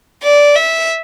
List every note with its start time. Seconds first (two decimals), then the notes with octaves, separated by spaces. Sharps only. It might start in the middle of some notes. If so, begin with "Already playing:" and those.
0.23 D5
0.55 E5